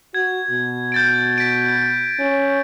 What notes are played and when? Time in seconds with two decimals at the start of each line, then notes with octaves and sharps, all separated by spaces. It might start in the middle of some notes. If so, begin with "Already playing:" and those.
0.14 F#4 G#6
0.51 B2
0.92 G6 A6 D7
1.38 B6 D7
2.20 C#4